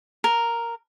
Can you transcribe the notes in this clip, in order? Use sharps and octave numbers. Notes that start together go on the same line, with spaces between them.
A#4